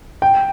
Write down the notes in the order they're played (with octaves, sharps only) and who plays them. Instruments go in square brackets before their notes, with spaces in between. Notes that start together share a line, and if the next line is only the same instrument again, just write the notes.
[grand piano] G5